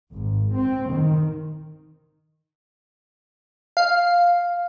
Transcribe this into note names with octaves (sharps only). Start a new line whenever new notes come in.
G#1
C4
D#3
F5